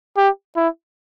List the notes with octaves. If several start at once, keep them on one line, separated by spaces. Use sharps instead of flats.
G4
E4